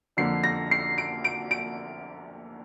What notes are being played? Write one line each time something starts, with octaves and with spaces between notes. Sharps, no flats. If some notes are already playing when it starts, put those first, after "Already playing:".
F2 D3 F3 A#3 C7
A#6
C7
D7
D7
D7